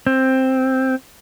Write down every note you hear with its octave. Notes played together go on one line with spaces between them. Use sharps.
C4